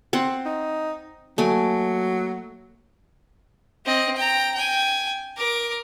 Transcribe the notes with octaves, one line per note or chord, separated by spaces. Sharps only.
C4 F#5
D#4
F#3 A3 A#3 G#5 D7
C4 D#5
G5 A#5
G5 G#5
A#4 D6